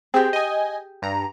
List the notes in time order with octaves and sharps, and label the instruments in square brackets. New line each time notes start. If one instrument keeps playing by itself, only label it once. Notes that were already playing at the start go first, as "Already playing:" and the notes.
[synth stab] C4 [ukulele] G4 G#4
[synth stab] D#5 G#5
G2 A#5